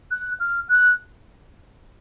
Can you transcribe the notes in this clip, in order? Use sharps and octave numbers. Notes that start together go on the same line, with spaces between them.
F#6
F6
F#6